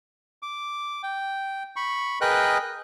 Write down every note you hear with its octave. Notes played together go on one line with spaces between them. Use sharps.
D6
G5
B5 C#6
G#4 A#4 B4 D#5 G5 F#6